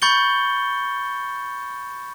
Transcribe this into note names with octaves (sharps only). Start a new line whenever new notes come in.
B5 C#6 G6 A6 C#7 G7